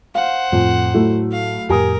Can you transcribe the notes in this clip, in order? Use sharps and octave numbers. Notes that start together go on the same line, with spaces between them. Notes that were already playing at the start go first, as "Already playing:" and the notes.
C5 F5 F#5
F2 A2
F#3 A3 E4
F5
F2 A2 G4 A#4 G#5 D#6